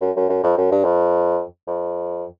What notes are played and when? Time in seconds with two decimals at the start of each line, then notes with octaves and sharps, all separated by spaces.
0.02 F#2
0.16 F#2
0.30 F#2
0.43 F2
0.57 F#2
0.72 G2
0.84 F2
1.67 F2